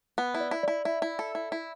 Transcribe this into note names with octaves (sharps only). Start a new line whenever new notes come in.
B3
E4
D5
E4
D5
E4
E4 E5
E4
A4
E4
E4